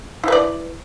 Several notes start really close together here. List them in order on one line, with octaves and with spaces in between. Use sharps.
E4 B4 D5